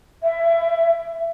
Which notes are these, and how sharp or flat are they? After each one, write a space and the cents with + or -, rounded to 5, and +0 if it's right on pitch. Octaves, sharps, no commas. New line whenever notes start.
E5 +20